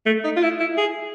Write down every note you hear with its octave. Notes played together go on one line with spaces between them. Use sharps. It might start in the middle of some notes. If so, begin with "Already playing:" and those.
A3
D#4
F4
E4
E4
G#4